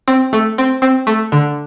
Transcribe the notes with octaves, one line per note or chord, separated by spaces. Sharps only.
C4
A3
C4
C4
A3
D3